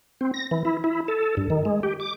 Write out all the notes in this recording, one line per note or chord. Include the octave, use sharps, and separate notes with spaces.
C4
A#6
E3
E4
E4
A4
G2
D#3
G#3
G4
D6